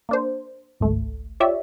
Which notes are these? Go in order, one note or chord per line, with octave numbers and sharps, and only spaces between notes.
A#3 D4 C5
G#1 C#2 A3
F4 G4 C#5 D5 E5